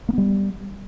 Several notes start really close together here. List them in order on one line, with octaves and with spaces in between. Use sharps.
A#3 B3 G3